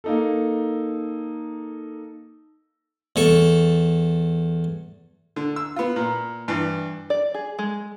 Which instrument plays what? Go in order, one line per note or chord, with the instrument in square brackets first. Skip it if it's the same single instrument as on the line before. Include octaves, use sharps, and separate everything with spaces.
[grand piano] A#3 D#4 A4
[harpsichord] E2 A4 C#6
[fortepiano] D3
E6
B3 F4
A#2
G2 E3
[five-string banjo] D5
G#4
G#3